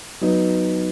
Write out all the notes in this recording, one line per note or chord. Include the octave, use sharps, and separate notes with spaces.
F#3 B3 D#4